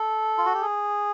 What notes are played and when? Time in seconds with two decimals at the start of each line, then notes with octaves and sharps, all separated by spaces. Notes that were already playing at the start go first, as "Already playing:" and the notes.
Already playing: A4
0.38 F4
0.45 F#4
0.54 G4
0.62 G#4